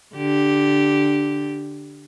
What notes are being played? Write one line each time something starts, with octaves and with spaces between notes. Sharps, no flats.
D3 G4